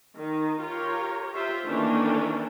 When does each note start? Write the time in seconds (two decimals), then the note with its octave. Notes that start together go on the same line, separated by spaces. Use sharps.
0.17 D#3
0.61 F4 G4 A#4 C#5
1.34 F4 G4 C5 E5
1.65 D#3 E3 A3 A#3 C#4 D4